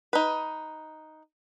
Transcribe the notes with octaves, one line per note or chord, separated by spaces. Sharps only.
D#4 B4